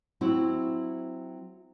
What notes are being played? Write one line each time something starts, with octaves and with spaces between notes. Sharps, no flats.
F#3 C4 E4 F#4